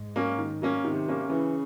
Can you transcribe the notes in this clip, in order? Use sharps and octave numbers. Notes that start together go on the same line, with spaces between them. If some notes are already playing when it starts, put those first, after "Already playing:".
Already playing: G#2
F#3 A#3 C#4
D#3
F#3 A#3 C#4
C3 D#3
F#3 A#3 C#4
C#3 E3